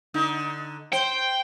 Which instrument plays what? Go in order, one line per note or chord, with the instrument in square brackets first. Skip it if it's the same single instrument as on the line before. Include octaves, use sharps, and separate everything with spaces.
[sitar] D3 D#4
[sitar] C5 [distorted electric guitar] G5